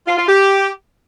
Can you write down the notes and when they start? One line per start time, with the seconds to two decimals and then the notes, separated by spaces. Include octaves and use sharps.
0.07 F4
0.18 F4
0.28 G4